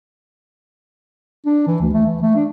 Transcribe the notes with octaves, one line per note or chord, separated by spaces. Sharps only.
D4
E3
D2
A3
E3
A3
D4